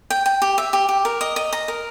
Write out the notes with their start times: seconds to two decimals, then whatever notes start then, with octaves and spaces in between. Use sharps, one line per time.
0.10 G5
0.26 G5
0.42 G4
0.58 E5
0.73 G4
0.89 G4
1.05 A#4
1.21 D#5
1.36 D#5
1.53 A#5
1.68 A#4